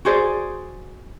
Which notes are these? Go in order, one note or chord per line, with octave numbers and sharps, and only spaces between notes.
F#4 G#4 C5 D5